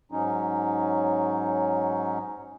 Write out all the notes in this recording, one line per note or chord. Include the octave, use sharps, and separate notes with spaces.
G#2 F#3 C#4 D#4